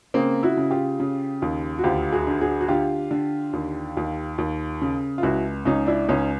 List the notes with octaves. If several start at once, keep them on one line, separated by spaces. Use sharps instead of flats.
C#3 A#3 C4
E4 F#4
C#3
F4 G4
C#3
D#2
F#4
D2 F4 G4
F#4 G#4
D3
F#4 G#4
F#4
D3 F4 G4
D3
D#2
D#2
D#2
C#3
F4
C#2 E4 F#4
C#2 C#4 D#4
D4 E4
C#2 C#4 D#4